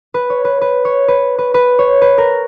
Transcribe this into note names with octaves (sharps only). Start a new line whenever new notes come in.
B4
C#5
B4
B4
C#5
B4
B4
B4
C#5
B4
A#4